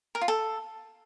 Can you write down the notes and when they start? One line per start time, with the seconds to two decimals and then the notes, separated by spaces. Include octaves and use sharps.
0.15 A#4
0.21 F4
0.28 A4